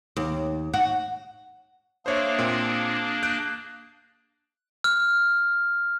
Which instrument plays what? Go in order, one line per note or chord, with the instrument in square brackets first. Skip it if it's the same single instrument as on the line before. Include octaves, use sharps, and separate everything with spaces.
[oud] D#2
F#4
[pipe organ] A#3 D4 G#4 [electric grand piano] C5 C#5 E5
[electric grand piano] A#2 C4
F#6 G6 D7
[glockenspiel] F6